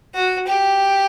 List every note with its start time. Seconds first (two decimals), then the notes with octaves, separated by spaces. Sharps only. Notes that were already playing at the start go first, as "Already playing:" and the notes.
0.14 F#4
0.47 G4